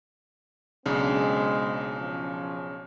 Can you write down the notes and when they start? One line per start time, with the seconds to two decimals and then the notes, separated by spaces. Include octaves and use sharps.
0.86 B1 C#3 G#3 C4 D4
1.97 F3 C#4